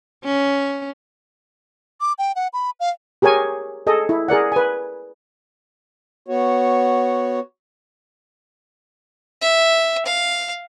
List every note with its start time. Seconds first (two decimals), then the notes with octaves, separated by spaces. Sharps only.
0.24 C#4
2.00 D6
2.18 G5
2.35 F#5
2.53 B5
2.80 F5
3.22 G4 G#4 A#4 C#5 G#5
3.87 G#4 A4 D#5
4.09 E4
4.28 G#4 A#4 D5 F#5
4.52 B4 G#5
6.28 B3 F#4 C#5
9.41 E5
10.06 F5